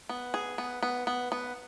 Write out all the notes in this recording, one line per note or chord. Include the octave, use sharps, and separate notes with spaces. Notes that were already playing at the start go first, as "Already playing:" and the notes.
B3
G#4
B3
B3
B3
B3